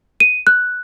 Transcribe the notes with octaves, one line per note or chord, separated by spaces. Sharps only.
D#7
F#6